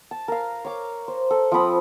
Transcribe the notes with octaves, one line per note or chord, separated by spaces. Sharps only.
A5
A#4 F5
C#5 D6
C5
A4
F3 C4 B5 D#6